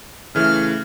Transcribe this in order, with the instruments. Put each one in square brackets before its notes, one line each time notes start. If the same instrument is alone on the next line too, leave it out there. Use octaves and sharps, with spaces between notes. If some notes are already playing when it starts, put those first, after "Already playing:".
[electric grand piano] C#3 E3 A3 [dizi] F6